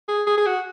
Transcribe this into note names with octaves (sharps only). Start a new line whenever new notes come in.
G#4
G#4
G#4
F#4